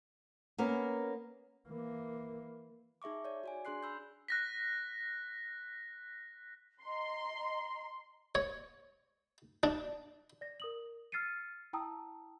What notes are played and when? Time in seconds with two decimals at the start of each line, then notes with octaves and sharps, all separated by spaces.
0.58 A#3 B3 C#4 A#4
1.69 E3 A#3
3.02 D#4 G#4 E5 C#6 D6
3.25 C#5 D5
3.44 F#4 D5 G#5
3.65 D4 G#4 C6 F#6 C7
3.83 B5 E6 G6
4.28 F#6 A#6 B6
6.83 D#5 A#5 C6
8.35 C#5
9.63 D4
10.41 D5 A#6
10.60 A#4 D#6 F#7
11.12 E6 F6 A6 C7 C#7 D#7
11.73 E4 G5 A5 A#5 D#6 E6